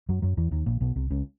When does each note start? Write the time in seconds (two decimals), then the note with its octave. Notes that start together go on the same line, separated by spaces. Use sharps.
0.09 F#2 F#3
0.22 F#2 F#3
0.37 E2 E3
0.51 D#2 D#3
0.66 A#1 A#2
0.80 B1 B2
0.96 C2 C3
1.10 C#2 C#3